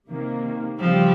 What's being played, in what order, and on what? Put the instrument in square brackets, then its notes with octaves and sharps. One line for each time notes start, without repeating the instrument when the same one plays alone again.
[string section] C3 D#3 A#3
[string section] C#3 G3 C4 G4 [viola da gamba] F3